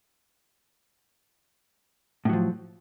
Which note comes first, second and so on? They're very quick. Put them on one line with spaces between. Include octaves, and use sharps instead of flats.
A2 F#3 F3